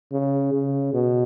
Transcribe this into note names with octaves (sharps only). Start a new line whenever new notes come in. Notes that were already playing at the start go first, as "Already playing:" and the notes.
C#3
C#3
B2